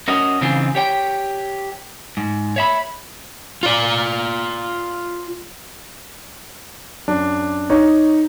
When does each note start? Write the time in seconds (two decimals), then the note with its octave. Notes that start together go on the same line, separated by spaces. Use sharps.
0.08 C#4 F#4 A#4 D#5
0.41 C#3 E3 C4 D#4 F4 G#4
0.75 G4 C#5 G5
2.17 G#2
2.56 C#5 E5 B5
3.63 F4 D5
7.08 F#2 D4
7.70 D#4 C#5